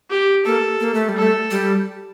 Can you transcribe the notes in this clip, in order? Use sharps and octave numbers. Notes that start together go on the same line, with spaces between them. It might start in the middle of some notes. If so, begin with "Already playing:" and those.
G4
A#3 A4
A#3
A3
G3
A4
A3
G3